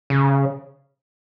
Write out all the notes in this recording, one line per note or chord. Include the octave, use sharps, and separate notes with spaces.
C#3